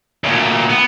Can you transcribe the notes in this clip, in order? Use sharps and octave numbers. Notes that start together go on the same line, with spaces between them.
D2 A#2
B3